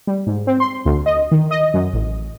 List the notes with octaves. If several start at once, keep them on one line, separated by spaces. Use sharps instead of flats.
G3
G#2
C4
C6
D2
D#5
D#3
D#5
F#2
A1